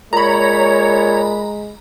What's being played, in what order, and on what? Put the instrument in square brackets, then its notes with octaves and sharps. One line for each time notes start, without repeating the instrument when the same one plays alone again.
[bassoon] A#2 [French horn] G#3 [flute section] C#5 [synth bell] A#5 B5